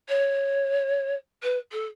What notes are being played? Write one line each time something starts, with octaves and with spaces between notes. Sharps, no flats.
C#5
B4
A4